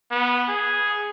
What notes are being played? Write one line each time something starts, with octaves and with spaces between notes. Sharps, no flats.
B3
G#4